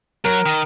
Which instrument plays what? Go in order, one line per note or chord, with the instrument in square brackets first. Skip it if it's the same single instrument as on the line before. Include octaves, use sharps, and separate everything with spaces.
[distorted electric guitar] F#3 [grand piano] A#4
[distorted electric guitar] D#3